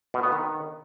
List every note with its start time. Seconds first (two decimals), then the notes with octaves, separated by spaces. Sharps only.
0.14 B2
0.23 B3
0.32 D#3